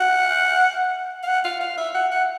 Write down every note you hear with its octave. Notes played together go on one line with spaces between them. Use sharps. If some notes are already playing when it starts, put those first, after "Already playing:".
Already playing: F#5
F5
F#5
F5
F5
E5
F#5
F#5